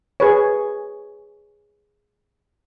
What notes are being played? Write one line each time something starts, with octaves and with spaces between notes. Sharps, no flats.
G#4 B4 C#5